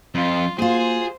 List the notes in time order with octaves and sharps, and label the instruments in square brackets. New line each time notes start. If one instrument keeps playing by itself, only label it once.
[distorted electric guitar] F2 [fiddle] F4
[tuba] A#3 [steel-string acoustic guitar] F4 F#4 [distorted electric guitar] G#4 [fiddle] C5